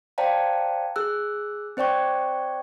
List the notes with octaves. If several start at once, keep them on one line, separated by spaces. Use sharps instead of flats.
C5 D5 F5 G5 A5 A#5
G#4 E6 F#6
C4 C5 D5 G5 C#6